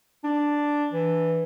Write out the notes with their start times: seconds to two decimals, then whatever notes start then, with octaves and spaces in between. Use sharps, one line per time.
0.24 D4
0.93 E3